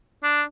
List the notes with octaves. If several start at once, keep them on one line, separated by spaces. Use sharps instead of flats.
D4